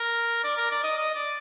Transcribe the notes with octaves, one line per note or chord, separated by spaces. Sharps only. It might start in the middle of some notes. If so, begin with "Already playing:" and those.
Already playing: A#4
D5
A#4
D5
D#5
D#5
D5